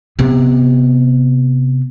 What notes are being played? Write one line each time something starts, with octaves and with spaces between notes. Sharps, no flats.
C3 B3